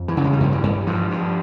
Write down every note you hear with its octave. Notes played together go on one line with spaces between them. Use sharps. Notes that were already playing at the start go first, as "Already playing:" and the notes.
Already playing: F2
E3
C#3
G#3
G3
G2 F3
E3 G3
G2
G2 F3
G2